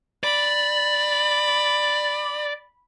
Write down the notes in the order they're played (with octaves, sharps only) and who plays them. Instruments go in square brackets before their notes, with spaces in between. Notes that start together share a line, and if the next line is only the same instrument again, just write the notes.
[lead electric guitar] D5 [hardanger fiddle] B5